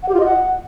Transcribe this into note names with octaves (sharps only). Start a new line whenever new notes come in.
F#5
G4
F4
D#5
F#5